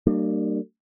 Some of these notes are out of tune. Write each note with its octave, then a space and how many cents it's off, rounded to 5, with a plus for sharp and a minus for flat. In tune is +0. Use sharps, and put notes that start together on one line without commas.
G3 -25 A#3 -35 D4 +40